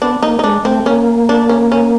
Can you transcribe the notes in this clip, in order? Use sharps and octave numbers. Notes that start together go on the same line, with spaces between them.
B3 D4
A#3 D#4
D#4
G#3 D4
A3 C4
A#3 C#4
D4
C#4
C#4